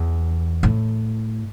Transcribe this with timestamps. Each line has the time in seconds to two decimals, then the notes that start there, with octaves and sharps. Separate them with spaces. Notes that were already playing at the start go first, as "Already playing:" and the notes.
Already playing: E2
0.63 A2